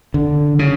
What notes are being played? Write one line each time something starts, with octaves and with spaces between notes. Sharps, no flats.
D3
C#3